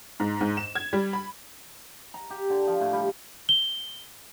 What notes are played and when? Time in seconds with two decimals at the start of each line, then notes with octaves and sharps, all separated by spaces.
0.20 G#2
0.41 G#2
0.57 E7
0.75 G#6
0.93 G3
1.13 B5
2.14 A#5
2.30 G4
2.50 D3
2.67 F3
2.80 A2
2.93 G3
3.49 G7